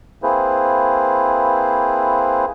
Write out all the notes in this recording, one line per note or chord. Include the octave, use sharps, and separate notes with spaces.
A#3 C4 E4 G#4 B4 C5